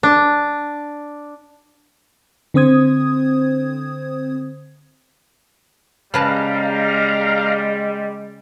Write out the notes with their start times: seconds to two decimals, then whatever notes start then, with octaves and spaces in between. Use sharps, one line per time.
0.03 D4
2.54 D3 C4 C5 D#6 G#6
6.14 C#3 G3 G#3 B4 F5 A5 A#5